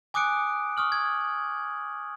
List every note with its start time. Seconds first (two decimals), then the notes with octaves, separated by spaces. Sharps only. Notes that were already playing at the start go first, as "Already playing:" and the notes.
0.14 G#5 D6 D#6 F#6 C#7 D7
0.77 C#6 D#6 F6 F#7
0.92 G#6